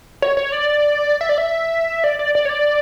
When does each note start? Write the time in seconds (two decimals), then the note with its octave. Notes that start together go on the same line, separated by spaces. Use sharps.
0.22 C#5
0.37 C#5
0.52 D5
1.21 E5
1.29 D5
1.38 E5
2.04 D5
2.19 D5
2.35 D5
2.45 C#5
2.49 D5